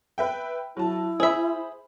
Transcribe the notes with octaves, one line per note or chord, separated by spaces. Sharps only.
B4 E5 G5
F#3 E4 A5
G#4 C5 E5 B5